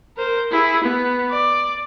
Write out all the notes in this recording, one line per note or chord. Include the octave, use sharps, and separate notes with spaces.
A#4 C5
E4 G#4
B3
D5